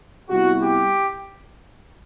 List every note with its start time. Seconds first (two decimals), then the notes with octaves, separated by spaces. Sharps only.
0.30 C3 G3 B3 E4 F#4
0.61 G4